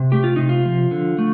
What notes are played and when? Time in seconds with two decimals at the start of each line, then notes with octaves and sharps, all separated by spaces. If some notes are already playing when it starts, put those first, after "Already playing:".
Already playing: C3
0.12 A3 G4
0.24 F4
0.36 C3 D#4
0.49 F4
0.65 F3
0.91 D3
1.19 A3